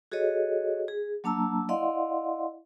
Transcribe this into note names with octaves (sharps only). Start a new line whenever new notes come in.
F#4 G#4 A4 C#5 D#5
G#4
F#3 A#3 D4 A5 A#5 E6
E4 D5 D#5 F5 F#5 C6